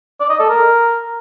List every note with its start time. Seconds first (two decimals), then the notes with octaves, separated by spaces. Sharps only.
0.20 D5
0.30 D#5
0.40 A4
0.49 A#4